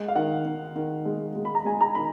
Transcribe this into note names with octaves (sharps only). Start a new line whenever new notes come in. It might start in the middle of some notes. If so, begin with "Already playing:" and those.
Already playing: G#3 F#5
F5
D#3 F#5
D#3
D#3
G#3
G#3
B5
A#5
G#3 G#5
A#5
D#3 B5